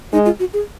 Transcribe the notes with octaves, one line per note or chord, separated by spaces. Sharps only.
G#3 D#4
F4
F#4
G#4